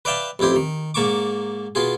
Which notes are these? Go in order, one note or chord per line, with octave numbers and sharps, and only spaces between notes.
B4 D5 E5 F5 G5 A5
A1 F2 E4 G4 C5
D#3
G#2 A#3 A5 C#6 D6
B2 F4 G#4